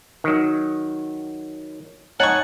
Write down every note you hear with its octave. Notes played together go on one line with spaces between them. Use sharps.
D#3 F#3
D#4 C#5 F#5 G#5 A5 C#6